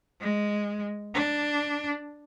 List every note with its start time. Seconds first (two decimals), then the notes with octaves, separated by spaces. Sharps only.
0.21 G#3
1.14 D4